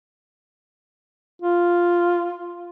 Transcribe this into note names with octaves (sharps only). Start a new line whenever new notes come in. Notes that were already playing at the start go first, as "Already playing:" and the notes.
F4